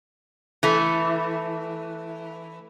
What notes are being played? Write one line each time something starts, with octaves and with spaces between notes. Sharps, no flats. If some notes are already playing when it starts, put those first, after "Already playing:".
E3 A3